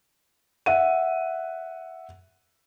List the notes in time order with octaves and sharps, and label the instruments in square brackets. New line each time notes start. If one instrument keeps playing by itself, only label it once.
[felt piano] E5 F#5 D#7